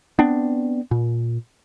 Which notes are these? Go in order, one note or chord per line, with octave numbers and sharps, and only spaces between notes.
B3 C4 D4
A#2